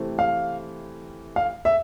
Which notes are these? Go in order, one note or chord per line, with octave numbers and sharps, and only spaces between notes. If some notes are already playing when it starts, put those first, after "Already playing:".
Already playing: C3 E3 A3 C4
F5
F5
E5